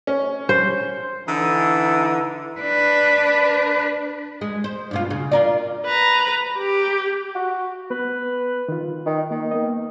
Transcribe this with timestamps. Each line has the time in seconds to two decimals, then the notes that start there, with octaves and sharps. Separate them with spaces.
0.07 C#4
0.49 C5
1.27 D3 E3 D#4 E4
2.60 D4 B4
4.41 G#3
4.64 C5
4.91 G2 B2 F4
5.10 C#3
5.32 F4 A#4 D5
5.86 B4 A#5
6.58 G4
7.35 F#4
7.90 B3 B4
8.69 D#3 F4
9.06 D#3 D#4
9.31 D#3 A#3
9.51 A#3 B3 D#5